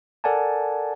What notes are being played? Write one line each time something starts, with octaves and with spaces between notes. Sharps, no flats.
A4 A#4 D5 F#5 G#5 A5